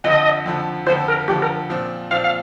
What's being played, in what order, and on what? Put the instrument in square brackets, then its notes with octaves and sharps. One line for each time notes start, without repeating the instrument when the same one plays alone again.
[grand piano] F2 D3 F3 [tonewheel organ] D#5
[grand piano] F2 D3 F3
[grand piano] F2 D3 F3 [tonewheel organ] C5
[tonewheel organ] A#4
[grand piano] F2 D3 F3 [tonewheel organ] G4
[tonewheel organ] A#4
[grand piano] A#2 F3 C4
[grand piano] A#2 F3 C4 [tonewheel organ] F5
[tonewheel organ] F5